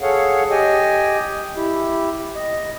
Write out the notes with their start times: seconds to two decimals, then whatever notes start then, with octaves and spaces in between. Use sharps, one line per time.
0.01 G#4 A4 C#5 F5 F#5
0.51 G4 D#5 G5 G#5
1.56 E4 G4
2.35 D#5